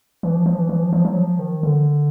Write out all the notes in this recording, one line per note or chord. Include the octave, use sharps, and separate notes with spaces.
E3
F3
F3
E3
E3
F3
F3
F#3
F3
D#3
D3